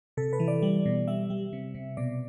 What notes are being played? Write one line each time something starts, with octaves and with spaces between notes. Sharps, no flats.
C3 A4
B4
E3
D5
G3
B2
G3 E5
G3
C3
C3
B2 D5